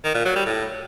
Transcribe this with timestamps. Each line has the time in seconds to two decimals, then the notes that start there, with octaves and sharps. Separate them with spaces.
0.04 D#3
0.15 A#2
0.25 F#3
0.36 G3
0.46 A2